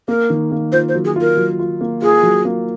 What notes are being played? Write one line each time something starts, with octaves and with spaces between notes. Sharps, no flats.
A#3 A#4
D#3
A#3
F4 C5
C5
F#3
G#4
F4
A#4
F#3
F4
A#3
F4 G#4
F#3
A#3